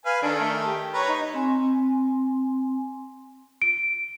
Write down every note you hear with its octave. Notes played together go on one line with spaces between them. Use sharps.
B4 F5 G#5
D#3 D4 A4
A3
G4
B4 C#5 A#5
D#4
C4 G#5 C6
D7